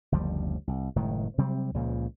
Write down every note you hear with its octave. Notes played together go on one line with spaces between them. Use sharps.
F#1 D2 F3 G3
C2
F#1 A2 D#3 G#3
C3 F#3 G3 C4
C#2 A#2 C#3 F3